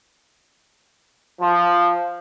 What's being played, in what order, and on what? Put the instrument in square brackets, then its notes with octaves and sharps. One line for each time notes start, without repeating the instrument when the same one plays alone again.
[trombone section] F3